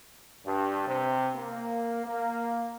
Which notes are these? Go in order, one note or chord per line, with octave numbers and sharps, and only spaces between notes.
G2
C3
A#3
A#3